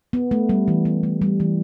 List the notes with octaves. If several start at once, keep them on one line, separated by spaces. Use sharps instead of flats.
B3
A3
G3
E3
B3
A3
G3
E3